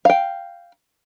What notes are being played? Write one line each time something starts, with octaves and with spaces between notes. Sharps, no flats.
F5 G5